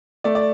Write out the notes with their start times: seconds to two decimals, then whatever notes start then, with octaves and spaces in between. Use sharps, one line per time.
0.24 A3 D5
0.35 D5